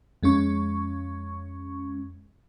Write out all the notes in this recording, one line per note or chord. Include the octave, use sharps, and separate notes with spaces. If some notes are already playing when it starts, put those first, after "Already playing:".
F2 G#3 C#4 C#6